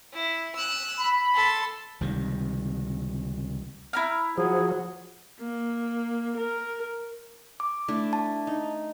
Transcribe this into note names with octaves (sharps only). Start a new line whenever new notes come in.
E4
E6 F#6
B5
A4 C6
C#2 C3 D#3 G3
E4 A#5 F6
F3 F#3 G#4
A#3
A#4
D6
A3 D4 E4
A5
D#4